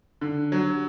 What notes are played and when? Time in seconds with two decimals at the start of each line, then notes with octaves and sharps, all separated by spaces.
0.21 D3 D4
0.37 D4
0.52 F#3 D4
0.67 G4